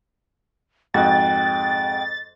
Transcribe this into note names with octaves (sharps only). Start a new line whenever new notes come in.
F2 G#2 F#4 G5 A6